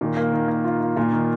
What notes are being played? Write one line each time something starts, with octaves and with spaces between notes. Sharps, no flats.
A#2 D#3
A#3
D#3
A#3
F4
F4
A#2 F4
D#3